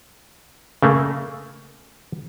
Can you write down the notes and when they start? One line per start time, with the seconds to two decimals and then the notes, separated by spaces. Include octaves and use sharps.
0.82 C#3 A3 A#3